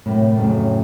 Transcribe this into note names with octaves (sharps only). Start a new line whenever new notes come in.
F#2 A2 C3
F2 A2 C#3 F#3